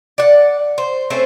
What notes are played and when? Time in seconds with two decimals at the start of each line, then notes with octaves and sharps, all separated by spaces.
0.18 D5 F#5
0.78 C5
1.10 A3 C4 C#4 C5